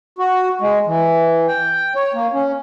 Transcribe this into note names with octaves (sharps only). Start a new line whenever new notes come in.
F#4
G#3
E3
G5
C#5
A#3
C#4